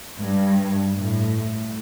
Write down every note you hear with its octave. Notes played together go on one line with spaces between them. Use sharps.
G2
A2